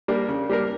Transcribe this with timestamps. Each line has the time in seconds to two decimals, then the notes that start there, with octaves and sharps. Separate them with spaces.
0.08 G3 A#3 D4 A#4
0.28 C#3
0.49 G3 A#3 D4 A#4